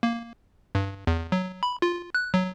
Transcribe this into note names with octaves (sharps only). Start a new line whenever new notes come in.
A#3
G2
E2
F#3
B5
F4
F#6
F#3